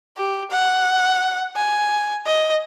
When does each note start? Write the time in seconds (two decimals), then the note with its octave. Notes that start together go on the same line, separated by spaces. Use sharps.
0.17 G4
0.51 F#5
1.56 G#5
2.26 D#5